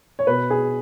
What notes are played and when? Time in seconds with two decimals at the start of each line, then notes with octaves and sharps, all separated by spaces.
0.19 C#5
0.27 B2 B4
0.50 G#4